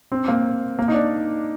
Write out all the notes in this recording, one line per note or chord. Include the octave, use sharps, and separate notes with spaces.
C4
A#3
A#3
D#4
D4